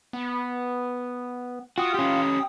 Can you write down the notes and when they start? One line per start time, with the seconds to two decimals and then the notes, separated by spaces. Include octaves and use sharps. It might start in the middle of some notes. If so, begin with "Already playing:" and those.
0.13 B3
1.78 F4 F#4 G5 D#6
1.94 C#4 G4